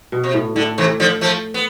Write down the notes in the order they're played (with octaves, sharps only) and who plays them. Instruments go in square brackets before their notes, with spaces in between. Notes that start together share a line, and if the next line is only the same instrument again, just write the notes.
[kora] B2
[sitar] C3
[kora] A2
[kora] A2 [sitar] D3
[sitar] C3 E3
D3 F3
F3 A3
B3